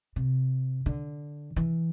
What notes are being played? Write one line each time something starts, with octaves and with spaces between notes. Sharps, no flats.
C3
D3
E3